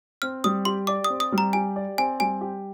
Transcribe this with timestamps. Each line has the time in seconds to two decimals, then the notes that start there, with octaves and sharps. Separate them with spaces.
0.22 C4 F6
0.44 G3 D#6
0.65 G4 C6
0.87 D5 D6
1.04 D#6
1.10 C4
1.20 D#6
1.32 G3
1.38 A#5
1.53 G4 G#5
1.76 D5
1.98 C4 G#5
2.20 G3 G#5
2.41 G4